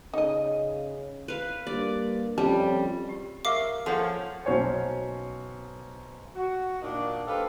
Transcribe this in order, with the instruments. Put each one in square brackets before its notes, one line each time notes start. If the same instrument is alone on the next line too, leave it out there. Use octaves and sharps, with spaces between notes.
[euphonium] C#3 [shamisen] D#4 D#5
[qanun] B4 F5
[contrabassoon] G2 [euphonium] A#3 [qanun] D5
[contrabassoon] F2 [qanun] G3 [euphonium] C#4 [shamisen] A5
[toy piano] G4
[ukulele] A#4 E5 [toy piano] F5 C#6 [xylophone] D6 C7
[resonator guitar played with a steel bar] F3 A#3 C#4 [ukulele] A4 [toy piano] C#5 F#5
[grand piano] B1 C#4 F#4 C5 C#5 G#5
[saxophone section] F#4
A#2 D#3 A#3 D4
G4 A4 B4 C5 F5